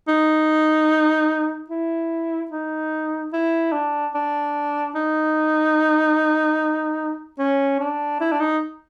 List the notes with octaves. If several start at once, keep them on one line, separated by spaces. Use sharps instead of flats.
D#4
E4
D#4
E4
D4
D4
D#4
C#4
D4
E4
D4
D#4